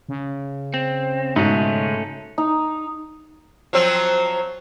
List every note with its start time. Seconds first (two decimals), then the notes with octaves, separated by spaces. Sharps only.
0.09 C#3
0.74 C4
1.36 G#2 B2 A3 C#4
2.38 D#4
3.73 F3 F#3 C4